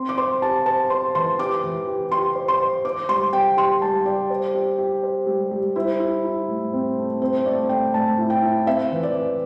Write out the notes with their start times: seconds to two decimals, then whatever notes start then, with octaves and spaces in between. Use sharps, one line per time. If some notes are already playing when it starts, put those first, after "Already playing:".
Already playing: C4 C6
0.09 D6
0.18 C5 C6
0.42 G4 A5
0.66 C5 A5
0.90 C5 C6
1.15 E3 C6
1.39 G4 D6
1.64 E3
1.87 G4
2.12 G4 C6
2.35 C5
2.48 C6
2.61 C5
2.85 C5 D6
3.09 G3 C6
3.33 G4 G5
3.57 G4 C6
3.82 G3 A5
4.05 G4 D5
4.30 C5
4.55 G4
4.78 G4
5.03 C5
5.27 G3
5.51 G3
5.76 E4 C5
6.00 E4
6.25 E4
6.48 A2
6.73 C4
6.98 A3
7.21 C4 C5
7.45 A3 D5
7.69 A3 G5
7.94 A2 A5
8.18 E4
8.30 G5
8.43 E4
8.67 C4 E5
8.92 E3
9.03 D5
9.15 E3